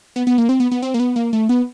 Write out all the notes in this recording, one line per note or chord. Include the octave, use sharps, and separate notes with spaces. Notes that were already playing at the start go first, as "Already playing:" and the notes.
B3
B3
A#3
C4
B3
B3
C4
A#3
B3
A#3
A3
B3